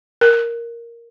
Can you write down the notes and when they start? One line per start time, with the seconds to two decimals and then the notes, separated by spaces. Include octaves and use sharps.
0.21 A#4